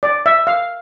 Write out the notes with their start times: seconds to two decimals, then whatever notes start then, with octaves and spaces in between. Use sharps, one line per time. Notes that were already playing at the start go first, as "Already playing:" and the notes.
0.03 D5
0.26 E5
0.47 F5